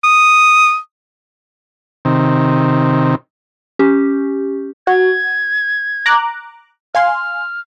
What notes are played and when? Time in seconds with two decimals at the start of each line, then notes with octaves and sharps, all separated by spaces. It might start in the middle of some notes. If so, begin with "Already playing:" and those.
0.04 D#6
2.05 C3 D#3
3.79 C#4 G4
4.87 F#4 G#6
6.06 A#5 D6 F#6
6.95 F5 G#5 C6 F6